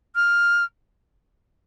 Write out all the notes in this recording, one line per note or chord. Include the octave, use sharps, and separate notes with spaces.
F6